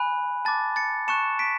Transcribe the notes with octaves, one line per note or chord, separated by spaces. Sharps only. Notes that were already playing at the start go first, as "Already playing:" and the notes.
Already playing: G#5 B5 F#6
A5 D6 F#6 A6
A6 C#7
A5 C#6 F#6 C#7 E7
B6 D7